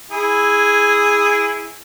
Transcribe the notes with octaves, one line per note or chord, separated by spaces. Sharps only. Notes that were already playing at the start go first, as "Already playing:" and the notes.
E4 G#4